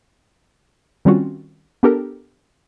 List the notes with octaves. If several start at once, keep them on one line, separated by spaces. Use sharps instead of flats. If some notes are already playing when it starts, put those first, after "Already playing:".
D#3 G3 C4 C#4 F4 F#4
B3 D4 G4 A4 A#4